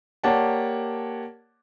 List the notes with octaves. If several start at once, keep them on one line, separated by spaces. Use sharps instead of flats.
A#3 G4 C#5 D5 F#5 A5